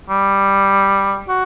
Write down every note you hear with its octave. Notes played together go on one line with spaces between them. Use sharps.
G3
F#4